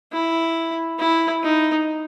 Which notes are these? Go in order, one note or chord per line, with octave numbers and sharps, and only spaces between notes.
E4
E4
D#4